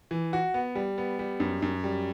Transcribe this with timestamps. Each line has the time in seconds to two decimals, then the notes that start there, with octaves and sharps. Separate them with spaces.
0.11 E3
0.33 F#4
0.54 B3
0.75 G3
0.98 B3
1.19 G3
1.40 F#2
1.62 F#2
1.84 G3